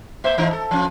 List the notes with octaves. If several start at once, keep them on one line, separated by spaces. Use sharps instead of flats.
A#3 C5 E5
A2 E3 D#4
A4
F3 C#4